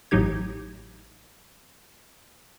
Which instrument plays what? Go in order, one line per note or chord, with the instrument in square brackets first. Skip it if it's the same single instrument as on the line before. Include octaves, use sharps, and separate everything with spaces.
[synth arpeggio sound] A1 A2 F#3 D#4 G4 G#6